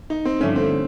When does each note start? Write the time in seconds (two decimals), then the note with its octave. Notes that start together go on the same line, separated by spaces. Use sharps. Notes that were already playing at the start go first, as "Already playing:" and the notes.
0.10 D#4
0.25 C4
0.40 G2 D3 F3 A3 C#4
0.56 C4